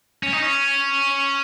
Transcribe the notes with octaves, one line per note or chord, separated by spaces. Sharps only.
C#4
D#4
C#4